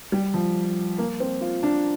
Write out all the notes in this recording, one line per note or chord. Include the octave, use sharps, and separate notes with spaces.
G3
F3
A#3
C4
F4
D4